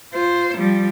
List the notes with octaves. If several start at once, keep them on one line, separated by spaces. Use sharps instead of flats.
F4 C5
F3 G3